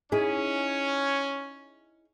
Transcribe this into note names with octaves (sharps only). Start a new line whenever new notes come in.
C#4 D#4 E4 G#4